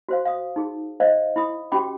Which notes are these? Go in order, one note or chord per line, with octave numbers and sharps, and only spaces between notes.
F#4 C5 F5
F5 D#6
D#4 G#4
C5 D5 D#5 F5
E4 B5 D#6
C#4 F#4 G4 G5 B5 D6